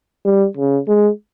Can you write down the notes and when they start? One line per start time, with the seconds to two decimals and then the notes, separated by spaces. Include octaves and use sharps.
0.25 G3
0.57 C#3
0.88 G#3